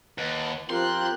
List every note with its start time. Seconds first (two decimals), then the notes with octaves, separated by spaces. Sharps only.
0.18 D#2 B4 F#5 A5
0.70 F3 C4 F4 G4 A#4 G5 C6 F#6